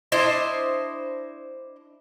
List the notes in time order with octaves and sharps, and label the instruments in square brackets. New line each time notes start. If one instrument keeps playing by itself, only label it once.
[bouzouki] D4 E4 C5 D#5